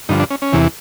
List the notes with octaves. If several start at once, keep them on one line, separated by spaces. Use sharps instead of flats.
G2 D3 F3 D#4
D4
C#4
C#4
E2 C3 E3